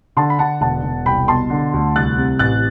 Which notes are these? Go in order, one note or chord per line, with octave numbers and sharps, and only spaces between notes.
D3 A5 C6
B5
D3 F#5 A5
E1 F#5 A5
E1
C2 G5 B5
B2 A5 C6
D3
D2
C2 F#6 A6
C3
A1 F#6 A6